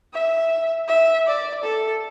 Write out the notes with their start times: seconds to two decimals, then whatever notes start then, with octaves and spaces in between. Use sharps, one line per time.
0.13 E5
0.88 E5
1.27 D5
1.64 A4